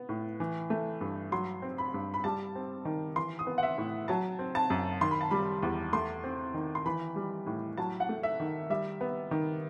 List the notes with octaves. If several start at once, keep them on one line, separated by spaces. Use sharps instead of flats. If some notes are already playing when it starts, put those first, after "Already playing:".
Already playing: B3
A2
E3
A3
G2
F#3 C6
C4
B5
G2
B5
G3 A5
C4
D#3
E3 C6
D#6
B3
F#5
E5
A2
F#3 A5
C4
A5
F#2
D#3 C6
B5
A5
G3 B5
E2
A3 C6
C4
D#3
C6
E3 B5
G3
A2
F#3 A5
F#5
A3
E5
D#3
G3 E5
B3
D#3